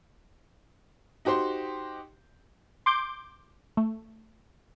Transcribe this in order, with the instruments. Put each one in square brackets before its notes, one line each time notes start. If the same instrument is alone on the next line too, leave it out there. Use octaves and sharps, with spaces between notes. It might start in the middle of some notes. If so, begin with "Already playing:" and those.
[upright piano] D#4 F#4 G4 C5 C6
[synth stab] C6 D6 G6
A3